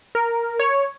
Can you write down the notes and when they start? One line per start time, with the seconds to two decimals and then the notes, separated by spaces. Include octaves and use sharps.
0.15 A#4
0.59 C#5